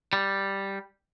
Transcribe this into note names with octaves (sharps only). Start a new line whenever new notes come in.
G3